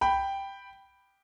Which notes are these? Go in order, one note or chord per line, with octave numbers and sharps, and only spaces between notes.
G5 B5